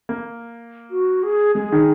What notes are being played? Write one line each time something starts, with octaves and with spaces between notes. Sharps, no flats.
A#3
F#4
G#4
G#3 G#4
D#3